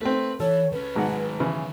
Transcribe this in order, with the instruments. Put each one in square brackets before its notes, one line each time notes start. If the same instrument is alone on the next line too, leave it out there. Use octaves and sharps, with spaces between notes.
[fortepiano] A3 C4 [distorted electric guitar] B4
[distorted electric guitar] E3 [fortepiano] A4 [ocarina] C#5
[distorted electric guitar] C#2 C#4 [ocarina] B4
[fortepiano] G#1 G#3 F#5 [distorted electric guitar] F#2 D#3
[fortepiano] C#3 E3